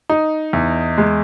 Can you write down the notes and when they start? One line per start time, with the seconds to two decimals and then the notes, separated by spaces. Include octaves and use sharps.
0.09 D#4
0.53 E2
0.98 G#3